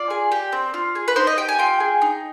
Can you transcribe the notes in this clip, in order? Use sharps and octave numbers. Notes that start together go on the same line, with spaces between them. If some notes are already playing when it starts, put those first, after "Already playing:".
Already playing: F4 D5
G#4
G4
C4
F4
G#4
B4
D#4 C5
D#5
G4 G5
G#5
F4 G5
G#4
D#4